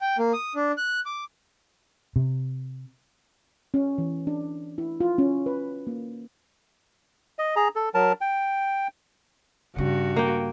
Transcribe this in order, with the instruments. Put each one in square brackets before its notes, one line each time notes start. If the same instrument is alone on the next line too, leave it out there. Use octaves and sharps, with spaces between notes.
[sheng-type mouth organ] G5
A#3
D#6
D4
F#6
D6
[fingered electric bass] C3
[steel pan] C#4
E3
D4
E4
F4
C#4
B4
A#3
[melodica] D#5
G#4 A#5
A4
F#3 A#4 A5
G5
[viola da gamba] G2 F#4 [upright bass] C#3 C#4
[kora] A#3 G5